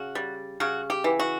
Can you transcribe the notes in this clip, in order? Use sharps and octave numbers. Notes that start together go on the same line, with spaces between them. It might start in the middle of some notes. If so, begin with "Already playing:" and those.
Already playing: C#3 F#4
G3
C#3 F#4
G4
E3
F#4